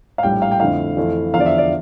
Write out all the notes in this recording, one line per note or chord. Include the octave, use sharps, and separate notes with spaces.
F5
A#1 A2 G3 G5
F5
G5
F2 D3 A3 E4 F5
F2 E3 A3 E4
E2 D3 F3 F5
D5
E5
D5